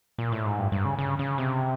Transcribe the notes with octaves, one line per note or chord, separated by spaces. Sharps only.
A#2
A2
G#2
G2
G2
C#3
C#3
C#3
C3